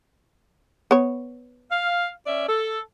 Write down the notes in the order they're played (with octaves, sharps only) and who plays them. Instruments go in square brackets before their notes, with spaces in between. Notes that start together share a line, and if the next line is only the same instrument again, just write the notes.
[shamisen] B3 C#5
[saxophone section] F5
C#4 D5 E5
A4